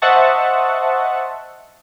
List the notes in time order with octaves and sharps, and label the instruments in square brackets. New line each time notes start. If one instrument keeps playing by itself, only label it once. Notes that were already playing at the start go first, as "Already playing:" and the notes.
[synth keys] C5 D#5 E5 F#5 A5 C#6